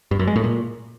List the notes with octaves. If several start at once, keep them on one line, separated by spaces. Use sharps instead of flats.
G2
F#2
G#3
A2
A#2